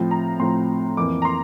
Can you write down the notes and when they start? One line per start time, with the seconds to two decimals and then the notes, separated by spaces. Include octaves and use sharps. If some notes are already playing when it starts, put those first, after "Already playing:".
Already playing: A2 F3 C4
0.11 A#5
0.40 A2 F3 C4 C6
0.97 F2 E3 A#3 D6
1.22 A#5
1.25 C6